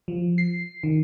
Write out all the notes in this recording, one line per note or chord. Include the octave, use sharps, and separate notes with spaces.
F3
C7
D#3